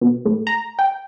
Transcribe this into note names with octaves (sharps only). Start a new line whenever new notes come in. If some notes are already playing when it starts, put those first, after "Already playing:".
B2
A2
A#5
G5